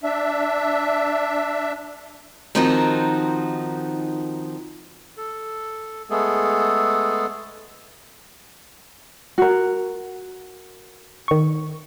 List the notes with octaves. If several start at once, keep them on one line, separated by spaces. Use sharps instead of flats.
D4 E5
D#3 F3 C4 D#4 F#4 A#4
A4
G#3 A3 B3 G#4 A4
F#4 A#4
D#3 C#6